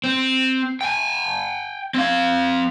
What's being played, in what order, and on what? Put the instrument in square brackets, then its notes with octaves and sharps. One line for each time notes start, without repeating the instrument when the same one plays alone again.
[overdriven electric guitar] C4
G5 G#5
C4 F5